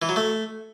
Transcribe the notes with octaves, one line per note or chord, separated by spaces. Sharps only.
E3
F#3
A3